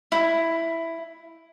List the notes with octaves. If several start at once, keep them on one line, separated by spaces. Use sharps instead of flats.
E4